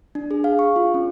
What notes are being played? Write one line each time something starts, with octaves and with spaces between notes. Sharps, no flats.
D4
G#4
F5
C#6
F4
C#4